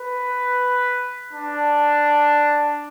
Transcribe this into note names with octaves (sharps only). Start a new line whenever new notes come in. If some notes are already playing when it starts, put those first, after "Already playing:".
Already playing: B4
D4